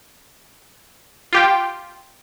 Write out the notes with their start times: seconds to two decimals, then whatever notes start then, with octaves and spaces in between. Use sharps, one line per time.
1.33 F4 G4 G5